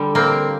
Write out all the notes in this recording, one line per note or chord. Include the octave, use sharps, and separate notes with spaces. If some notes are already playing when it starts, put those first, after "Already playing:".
Already playing: D3 G3
A#3 C4